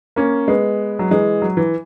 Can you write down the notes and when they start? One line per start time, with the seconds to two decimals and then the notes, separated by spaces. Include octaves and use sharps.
0.16 A#3 C#4
0.48 G#3 B3
0.99 F#3
1.11 E3 G#3
1.42 F#3
1.57 E3